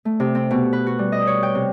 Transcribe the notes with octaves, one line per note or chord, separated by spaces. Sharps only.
A3
C3
C4
B2
B4
F#4
G3
D#5
C#5
G5
C3